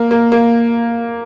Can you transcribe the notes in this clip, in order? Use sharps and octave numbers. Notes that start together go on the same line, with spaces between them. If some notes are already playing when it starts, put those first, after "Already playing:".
Already playing: A#3
A#3
A#3